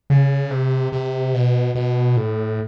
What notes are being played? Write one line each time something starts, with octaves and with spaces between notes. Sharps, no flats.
C#3
C3
C3
B2
B2
A2